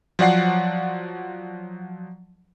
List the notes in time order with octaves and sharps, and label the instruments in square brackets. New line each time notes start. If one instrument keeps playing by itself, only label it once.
[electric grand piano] F3 F#3 D5 F#5 C7